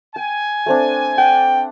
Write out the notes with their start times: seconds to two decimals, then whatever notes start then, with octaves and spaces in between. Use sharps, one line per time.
0.16 G5 G#5
0.66 A3 C4 D4
1.18 F#5 G5